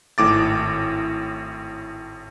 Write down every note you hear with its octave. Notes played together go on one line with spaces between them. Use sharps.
G#1 A2 D6 A6